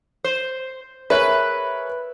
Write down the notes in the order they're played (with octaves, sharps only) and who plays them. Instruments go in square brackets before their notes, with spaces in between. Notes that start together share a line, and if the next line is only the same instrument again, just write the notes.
[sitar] C5
[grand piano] G#4 A#4 C#5 [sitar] B4 [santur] E5